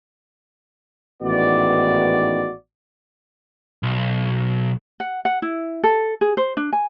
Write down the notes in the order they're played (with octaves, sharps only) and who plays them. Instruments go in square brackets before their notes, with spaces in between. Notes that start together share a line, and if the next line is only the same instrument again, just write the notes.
[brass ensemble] A1 G#2 D#3 B3 F#4 D5
[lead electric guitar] B1
[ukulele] F#5
F#5
E4
A4
G#4
C5
D4
G#5